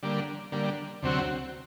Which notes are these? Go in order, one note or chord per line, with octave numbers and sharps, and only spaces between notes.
D3 G3 A#3
D3 G3 A#3
D2 C3 F#3 C4 F#4